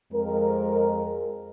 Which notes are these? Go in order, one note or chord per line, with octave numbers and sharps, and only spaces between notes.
F2 G#3 A#4